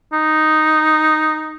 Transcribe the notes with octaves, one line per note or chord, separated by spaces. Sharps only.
D#4